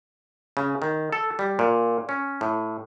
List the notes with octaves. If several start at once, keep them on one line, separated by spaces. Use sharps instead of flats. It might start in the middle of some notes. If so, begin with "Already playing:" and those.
C#3
D#3
A4
G3
A#2
C#4
A2